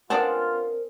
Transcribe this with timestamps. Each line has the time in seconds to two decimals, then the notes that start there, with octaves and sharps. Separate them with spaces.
0.10 B3 C4 D4 F4 G#4 A#4 A5